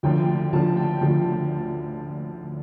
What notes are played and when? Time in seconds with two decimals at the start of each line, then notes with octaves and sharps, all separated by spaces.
0.03 D2 D3 F3 G5
0.52 D2 D3 F3 A5
0.77 G5
1.01 D2 D3 F3